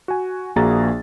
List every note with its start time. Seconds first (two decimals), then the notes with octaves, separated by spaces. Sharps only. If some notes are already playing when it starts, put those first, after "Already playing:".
0.08 F#4 G#5
0.56 A#1 A#3 F#4 G#4 A#5 A6